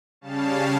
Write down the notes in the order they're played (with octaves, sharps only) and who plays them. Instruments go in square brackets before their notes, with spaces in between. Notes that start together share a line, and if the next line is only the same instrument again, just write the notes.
[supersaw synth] C#3 G3 C#4 F5 A5